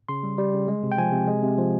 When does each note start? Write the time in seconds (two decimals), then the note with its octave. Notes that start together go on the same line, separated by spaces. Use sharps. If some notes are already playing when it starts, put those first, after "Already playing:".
0.09 C#3 C6
0.23 G3
0.38 G3
0.54 C#3
0.68 G#3
0.83 C3
0.92 G5
0.98 F3 G#5
1.13 C3
1.27 G#3
1.43 C3
1.58 F3